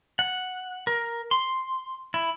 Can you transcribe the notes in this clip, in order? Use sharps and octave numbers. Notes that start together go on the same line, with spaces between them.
F#5
A#4
C6
E4